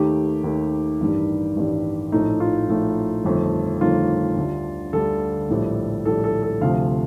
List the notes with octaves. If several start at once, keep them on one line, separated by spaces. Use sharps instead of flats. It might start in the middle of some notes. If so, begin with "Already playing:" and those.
Already playing: D#2 D#3 A3 G4
D#2 D#3 A3
A1 G2 D#3 G3
A1 G2 D#3 G3
A#1 A2 A3 D#4
F4
A#1 A2 A3
G1 F2 D#3 A3
G1 F2 D#3 A3 F4
D2 D3 G3
D2 D3 G3 A4
A#1 A2 G3
A#1 A2 G3 A4
A4
A4
D2 C3 F3 A3 F5